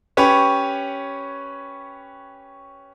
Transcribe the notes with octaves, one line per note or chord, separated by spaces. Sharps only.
C#4 G4 B4 C#5